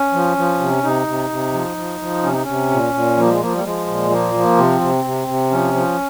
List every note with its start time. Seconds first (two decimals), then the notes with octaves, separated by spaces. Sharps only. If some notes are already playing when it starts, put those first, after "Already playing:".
Already playing: C#4
0.13 F3
0.37 F3
0.60 C3
0.83 C3 D#4
1.07 C3
1.30 C3
1.53 F3
1.77 F3
2.00 F3
2.23 C3 C#4
2.33 D#4
2.43 C3 C#4
2.71 A#2
2.94 A#2
3.17 F3 A#3
3.24 G3
3.29 G#3
3.41 F3 A#3
3.52 G3
3.58 A#3
3.64 F3 G#3
3.87 A#2
4.10 F3 A#3
4.34 F3
4.57 C3 C4
4.81 C3
5.04 C3
5.28 C3
5.51 F3 C#4
5.74 F3